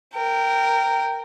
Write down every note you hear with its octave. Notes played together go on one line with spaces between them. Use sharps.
A#4 G5